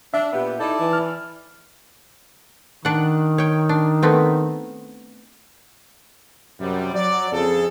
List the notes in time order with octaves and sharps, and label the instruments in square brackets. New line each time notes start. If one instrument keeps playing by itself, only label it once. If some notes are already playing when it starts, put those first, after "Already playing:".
[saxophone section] D4 [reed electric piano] E5
[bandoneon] A#2 [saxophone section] B3 G4
[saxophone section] D#4 A4 [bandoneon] E4 D5 A5
[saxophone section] E3
[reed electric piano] F6
[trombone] D#3 [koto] D4 F#5
[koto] C#5 G5
D4
A3 B3 C4
[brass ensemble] F#2 C3 G3
F#3 D5
F2 C#3 G#4 A4